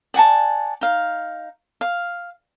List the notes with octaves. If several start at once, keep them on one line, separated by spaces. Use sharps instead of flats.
D5 F#5 G#5 A5
D#4 F5
F5